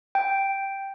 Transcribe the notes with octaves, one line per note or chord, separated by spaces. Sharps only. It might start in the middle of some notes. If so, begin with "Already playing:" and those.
G5